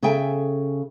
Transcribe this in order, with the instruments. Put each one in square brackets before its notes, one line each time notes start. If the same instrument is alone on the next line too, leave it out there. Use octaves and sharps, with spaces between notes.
[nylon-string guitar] C#3 G#4 A4 E5 G5 G#5